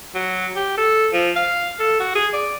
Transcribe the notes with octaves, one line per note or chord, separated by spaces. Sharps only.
F#3
G4
A4
F3
F5
A4
F#4
G#4
D5